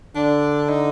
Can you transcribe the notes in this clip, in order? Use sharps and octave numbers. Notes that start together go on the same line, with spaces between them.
D3 D4
D#4